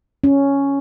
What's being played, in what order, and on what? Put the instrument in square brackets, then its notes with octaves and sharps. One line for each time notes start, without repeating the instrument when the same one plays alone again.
[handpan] C#4